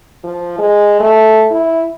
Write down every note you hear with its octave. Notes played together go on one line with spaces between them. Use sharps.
F3
G#3
A3
E4